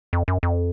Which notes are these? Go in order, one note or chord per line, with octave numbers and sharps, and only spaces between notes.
F2
F#2
F2